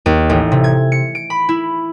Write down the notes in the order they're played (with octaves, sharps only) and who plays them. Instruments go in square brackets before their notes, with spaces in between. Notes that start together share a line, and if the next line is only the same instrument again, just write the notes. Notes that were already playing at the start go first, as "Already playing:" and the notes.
[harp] D#2
A1
C3
G#6
C#7
D7
B5
E4